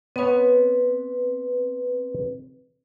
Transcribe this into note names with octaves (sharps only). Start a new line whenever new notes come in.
B3 C4 B4 C#5